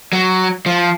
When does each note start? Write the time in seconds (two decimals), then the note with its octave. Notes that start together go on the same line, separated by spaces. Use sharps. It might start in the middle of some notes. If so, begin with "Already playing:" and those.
0.13 F#3
0.66 F3